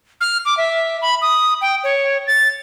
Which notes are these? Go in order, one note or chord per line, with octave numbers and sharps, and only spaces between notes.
F6
D6
E5
B5
D#6
G5
C#5
A6